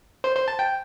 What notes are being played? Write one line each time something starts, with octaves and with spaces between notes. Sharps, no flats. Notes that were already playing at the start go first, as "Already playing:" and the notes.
C5
C5
A5
G5